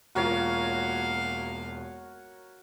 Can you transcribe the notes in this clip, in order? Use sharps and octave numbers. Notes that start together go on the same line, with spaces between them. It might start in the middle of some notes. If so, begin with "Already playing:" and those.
E1 A#3 F4 F#4 A#4 C#5 F5